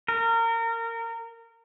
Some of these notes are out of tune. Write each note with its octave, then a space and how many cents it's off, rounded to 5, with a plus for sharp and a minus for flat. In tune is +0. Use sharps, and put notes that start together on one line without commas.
A#4 -25